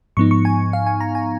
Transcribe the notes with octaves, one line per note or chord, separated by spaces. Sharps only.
G#2 F3 B3 D#4 C#6
C#6
G#5
F5
G#5
A#5
G#5